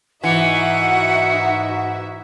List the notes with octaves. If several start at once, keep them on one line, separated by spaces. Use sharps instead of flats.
G#2 E3 D#4 F#4 E5 F#5